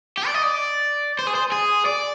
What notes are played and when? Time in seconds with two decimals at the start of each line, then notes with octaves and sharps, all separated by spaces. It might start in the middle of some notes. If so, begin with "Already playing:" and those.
0.17 G4
0.26 D5
0.34 D#5
0.43 D5
1.19 C5
1.27 G#4
1.35 C5
1.52 G#4
1.86 D5